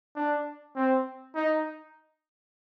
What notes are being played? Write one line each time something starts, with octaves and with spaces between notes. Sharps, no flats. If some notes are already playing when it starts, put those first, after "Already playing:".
D4
C4
D#4